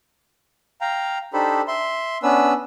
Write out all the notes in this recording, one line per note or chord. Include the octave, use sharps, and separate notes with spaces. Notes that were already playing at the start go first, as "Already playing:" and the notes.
F5 G5 A#5
D4 D#4 G4 A4 C5 B5
E5 C6
B3 C#4 D4 B4 E6